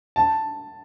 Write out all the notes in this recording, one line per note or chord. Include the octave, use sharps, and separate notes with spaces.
A5